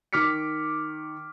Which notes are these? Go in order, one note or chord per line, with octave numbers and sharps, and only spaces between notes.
D#3 D6 F6 B6 C#7